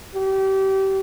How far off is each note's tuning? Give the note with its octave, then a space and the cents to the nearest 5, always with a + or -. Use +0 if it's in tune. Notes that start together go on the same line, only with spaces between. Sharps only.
G4 -25